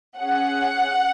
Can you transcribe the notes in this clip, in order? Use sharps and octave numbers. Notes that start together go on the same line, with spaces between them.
C#4 G#4 F#5